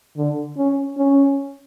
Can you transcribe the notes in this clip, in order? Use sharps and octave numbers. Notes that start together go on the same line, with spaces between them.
D3
C#4
C#4